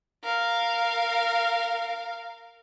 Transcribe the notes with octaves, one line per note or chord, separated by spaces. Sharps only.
A#4 F5